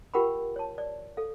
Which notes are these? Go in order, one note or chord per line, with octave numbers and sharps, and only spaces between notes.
F4 G4 A#4 F#5 G5 B5
C#5 A5
D5
A4 F5